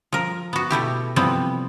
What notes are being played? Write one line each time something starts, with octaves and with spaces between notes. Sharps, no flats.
F3 A#4
B3 F#4
B2 A3 E4 G4
C3 E3 F3 G3 B3 C4